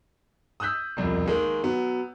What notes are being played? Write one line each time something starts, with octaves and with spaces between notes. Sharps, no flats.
D#6 E6 F#6 G6 B6
E1 C2 F2
D#3 G#3 A#3
F#3 B3